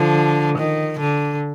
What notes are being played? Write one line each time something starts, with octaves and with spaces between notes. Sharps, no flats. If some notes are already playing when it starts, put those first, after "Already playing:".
Already playing: D3 F3
D#3
D3